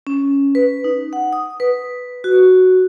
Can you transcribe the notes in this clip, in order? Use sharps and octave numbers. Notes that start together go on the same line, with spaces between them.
C#4
B4
D#4
F#5
D#6
B4
F#4